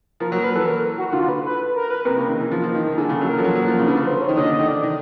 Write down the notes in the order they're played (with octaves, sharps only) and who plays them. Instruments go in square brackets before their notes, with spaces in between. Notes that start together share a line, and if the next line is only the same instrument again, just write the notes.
[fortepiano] F3 [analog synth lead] A#4
[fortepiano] F#3 [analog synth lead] A#4
[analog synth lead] B4
[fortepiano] E3 [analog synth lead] A4
[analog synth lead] A#4
F#4
F#4
[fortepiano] D3 [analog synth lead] F4
[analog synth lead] B4
B4
A#4
B4
[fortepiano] C3 [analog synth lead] A#4
[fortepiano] C#3
D#3
E3
F3
F3
D#3
D#3
[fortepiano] D3 [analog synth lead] G#4
[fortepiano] C#3
[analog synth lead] A4
[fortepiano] F#3
[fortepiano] E3 [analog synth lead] A#4
[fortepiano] F3
F#3
F#3
F3
C#3
D3
[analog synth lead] B4
[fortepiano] C#3
[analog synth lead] C5
C#5
[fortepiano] D#3
[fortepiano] D3 [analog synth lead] D#5
[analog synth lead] D#5
[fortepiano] D#3
[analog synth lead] D5
[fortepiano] D#3